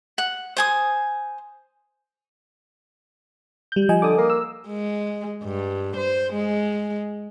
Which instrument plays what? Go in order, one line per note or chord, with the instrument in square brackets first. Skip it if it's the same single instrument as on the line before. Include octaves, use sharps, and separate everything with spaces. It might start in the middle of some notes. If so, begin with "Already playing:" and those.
[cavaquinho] F#5
C5 G#5 D#6
[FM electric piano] G3 G6
F3 D#5 G#5
[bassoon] D3 [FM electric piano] D6 D#6
[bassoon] A#3
[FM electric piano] E6
[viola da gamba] G#3
G2
C5
G#3